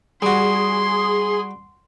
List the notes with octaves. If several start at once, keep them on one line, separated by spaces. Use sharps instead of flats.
G3 F#4 G#4 C6